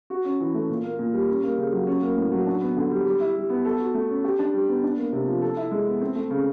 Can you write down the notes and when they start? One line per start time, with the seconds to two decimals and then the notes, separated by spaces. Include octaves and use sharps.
0.10 F#4
0.25 C#4
0.40 E3
0.54 A3
0.69 A#2
0.84 A#3
0.99 A#2
1.14 G3
1.28 C#4
1.43 A#3
1.58 C#3
1.72 F#3
1.87 C#4
2.03 A#3
2.17 A2
2.32 F#3
2.46 D4
2.61 B3
2.77 D3
2.91 G3
3.06 G3
3.20 E4
3.35 G3
3.50 B3
3.65 A4
3.79 F#4
3.94 A3
4.09 C#4
4.24 G4
4.39 D4
4.54 G3
4.68 B3
4.83 D4
4.97 A#3
5.12 C3
5.27 F3
5.41 A4
5.57 E4
5.71 G#3
5.87 B3
6.01 C4
6.15 A3
6.30 C#3